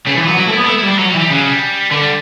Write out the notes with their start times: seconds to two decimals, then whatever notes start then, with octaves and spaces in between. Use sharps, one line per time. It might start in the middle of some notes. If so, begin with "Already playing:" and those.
0.07 C#3 A3
0.17 E3
0.22 B3
0.28 F#3
0.38 F#3 E4
0.48 A3
0.53 E4
0.58 B3
0.64 D4
0.68 A3 E4
0.79 G3 E4
0.89 D4
0.99 F#3 C#4
1.09 G3
1.15 E3
1.20 G3
1.30 C#3 F#3
1.46 G3
1.91 D3 A3
2.02 G3